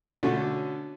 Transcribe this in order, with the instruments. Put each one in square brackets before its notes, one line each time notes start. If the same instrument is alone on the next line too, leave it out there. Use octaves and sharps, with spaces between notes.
[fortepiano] B2 D3 A3 C#4